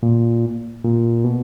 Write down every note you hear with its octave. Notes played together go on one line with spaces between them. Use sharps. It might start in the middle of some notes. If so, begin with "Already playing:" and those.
A#2
A#2
B2